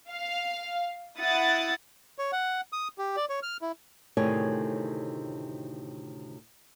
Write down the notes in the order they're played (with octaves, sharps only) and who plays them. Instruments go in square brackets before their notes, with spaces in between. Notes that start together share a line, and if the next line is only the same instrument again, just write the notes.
[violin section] F5
E4 F#5 D#6 A6
[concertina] C#5
F#5
D#6
G4
D5
C#5
F6
E4
[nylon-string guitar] D2 A2 C3 D#3 G#4 C#5